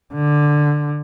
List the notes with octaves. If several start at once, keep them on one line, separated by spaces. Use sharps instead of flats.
D3